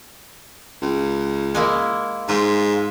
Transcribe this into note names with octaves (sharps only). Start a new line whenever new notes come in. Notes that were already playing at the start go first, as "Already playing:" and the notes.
C#2
G#3 A#3 E4
G#2 F4